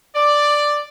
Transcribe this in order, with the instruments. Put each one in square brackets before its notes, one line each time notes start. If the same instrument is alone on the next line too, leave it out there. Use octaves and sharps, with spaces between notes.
[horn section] D5